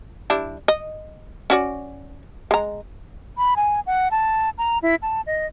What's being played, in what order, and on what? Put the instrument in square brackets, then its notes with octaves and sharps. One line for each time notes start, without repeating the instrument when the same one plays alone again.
[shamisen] G3 D4 E4
D#5
C#4 F#4 D5
G#3 A#5
[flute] B5
G#5
F#5
A5
A#5
E4
A5
D#5